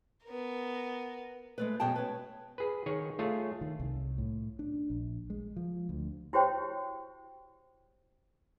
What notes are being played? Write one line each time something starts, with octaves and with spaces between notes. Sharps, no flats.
B3 A#4
G#3 A3 B4
F#2 B2 G#4 F#5 G5 A5
B4 C#5
G#4 B4
D#3 G#4 C#5
A3 F4 G#4 C#5
D#3
C2
A2
D4
A#1
G#3
F3
D2
E4 F#4 G4 C5 C#5 G5